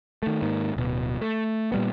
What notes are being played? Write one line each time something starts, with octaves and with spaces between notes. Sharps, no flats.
D#3 A3
G#2 D#3 A#3
D1 B2
A3
A#2 G3 B3